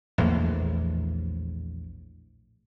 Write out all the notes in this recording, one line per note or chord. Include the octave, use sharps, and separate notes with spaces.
A#1 E2 A2 A#3